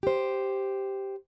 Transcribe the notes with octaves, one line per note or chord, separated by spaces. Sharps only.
G4 C5